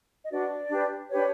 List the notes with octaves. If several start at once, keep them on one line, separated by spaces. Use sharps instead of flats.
D#5
D4 F#4 B4 D5
D4 G4 B4
D4 G4 B4 C#5